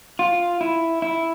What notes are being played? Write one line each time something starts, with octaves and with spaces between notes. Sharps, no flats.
F4
E4
E4